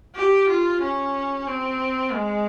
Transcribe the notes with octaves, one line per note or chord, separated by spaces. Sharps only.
G4
F4
C#4
C4
G#3